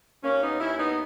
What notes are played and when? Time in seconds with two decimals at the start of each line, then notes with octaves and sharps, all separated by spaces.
0.23 D#2 A#3 C#4
0.41 B3 D#4
0.59 D#2 C#4 E4
0.77 B3 D#4